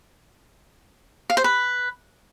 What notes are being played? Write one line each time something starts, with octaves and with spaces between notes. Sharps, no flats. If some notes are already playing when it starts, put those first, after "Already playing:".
F5
C5
B4